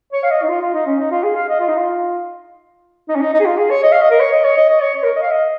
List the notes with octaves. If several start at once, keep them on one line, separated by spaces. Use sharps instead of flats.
C#5
F5
D#5
D#4
F4
F4
D#4
C#4
D#4
F4
G#4
F5
D#5
F4
D#4
F4
D#4
C#4
D#4
D#4
G#4
F4
G#4
C#5
D#5
F5
D#5
A#4
C#5
D#5
C#5
D#5
D#5
C#5
C#5
A#4
D#5
F5
D#5